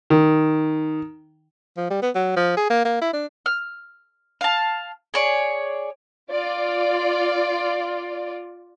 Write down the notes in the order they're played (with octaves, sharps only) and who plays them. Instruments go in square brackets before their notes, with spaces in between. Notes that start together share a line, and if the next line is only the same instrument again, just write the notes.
[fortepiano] D#3
[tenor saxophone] F3
G3
B3
F#3
F3
G#4
A#3
A#3
E4
D4
[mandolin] F6
F5 A5
G#4 C#5 D5
[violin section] F4 D5